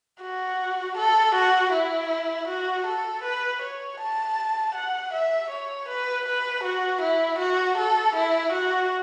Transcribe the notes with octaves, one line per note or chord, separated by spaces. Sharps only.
F#4
A4
F#4
E4
F#4
A4
B4
C#5
A5
F#5
E5
C#5
B4
B4
F#4
E4
F#4
A4
E4
F#4